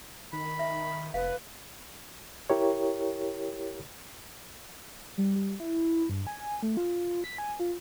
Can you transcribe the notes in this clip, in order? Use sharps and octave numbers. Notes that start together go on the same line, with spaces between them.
D#3 B5
E5
F1 B4 F5
E4 G4 A#4 C#5
G3
G3
E4
G2
G#5
A3
F4
B6
G#5
F4